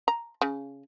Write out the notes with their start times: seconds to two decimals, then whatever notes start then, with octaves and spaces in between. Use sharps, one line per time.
0.08 A#5
0.42 C#3